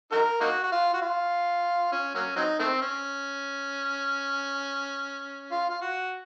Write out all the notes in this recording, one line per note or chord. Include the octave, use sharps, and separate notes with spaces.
D#4 F#4 A#4
A#3 D#4 F#4
F#4
F4
F#4
F4
C#4
F#3 A#3 C#4
F#3 C4 D#4
D#3 A3 C4
C#4
F4
F4
F#4